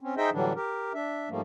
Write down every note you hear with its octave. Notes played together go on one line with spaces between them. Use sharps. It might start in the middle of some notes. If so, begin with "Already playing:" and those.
C4 C#4
D#4 G#4 C5 D#5 E5 G5
A2 D3 E3 F#3 G3 D4
G4 A#4
D4 E5
G#2 F3 G3 A3 A#3